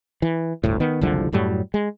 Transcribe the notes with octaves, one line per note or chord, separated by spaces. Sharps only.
E3
G1 D2 A2
D#3 B3
F#1 C2 D3 F3
F#2 A2 F#3 G3
G#3